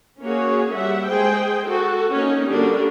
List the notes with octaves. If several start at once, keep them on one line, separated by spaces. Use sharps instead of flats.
A#3 C#4 F#4 G#4 C#5
G3 E5 F#5
G#3 G#4 C5 G5
F#4 A4
A#3 C#4 D#4
D3 G3 A#3 D4 F#4 A#4